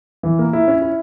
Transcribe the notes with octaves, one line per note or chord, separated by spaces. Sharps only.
E3
A#3
E4
C#4
E4